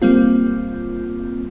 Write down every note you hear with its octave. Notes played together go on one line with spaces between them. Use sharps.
G3 A#3 C4 F4